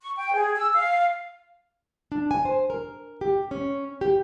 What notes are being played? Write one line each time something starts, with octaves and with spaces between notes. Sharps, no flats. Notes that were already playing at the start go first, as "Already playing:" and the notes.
C#6
G5
G#4
E6
F5
D4
G#5
C5
A#4
G4
C#4
G4